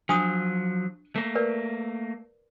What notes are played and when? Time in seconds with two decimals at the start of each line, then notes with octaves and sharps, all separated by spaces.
0.09 F3 F#3 D4 D#6
1.16 A3 A#3
1.35 A#4 B4 D5